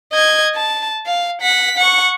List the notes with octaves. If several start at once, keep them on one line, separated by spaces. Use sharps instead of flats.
D#5 G#6
A5
F5
F#5 B6
F#5 C#6